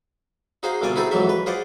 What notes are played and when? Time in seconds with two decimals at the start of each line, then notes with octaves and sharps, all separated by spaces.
0.63 D#4 F#4 G#4 C5 F5
0.81 C2 B2 D3 F4 D5 G#5
0.96 C4 D#4 E4 F#4 G#4 A4
1.11 F2 G#2 E3 F#3 F#4 E5
1.29 B4
1.46 F4 G#4 C5 D5 F#5